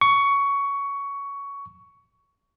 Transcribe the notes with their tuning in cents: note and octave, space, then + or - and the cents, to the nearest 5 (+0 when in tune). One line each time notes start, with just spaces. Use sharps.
C#6 +15